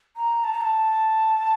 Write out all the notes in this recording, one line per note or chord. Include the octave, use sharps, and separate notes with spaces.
A#5
A5
A#5
A5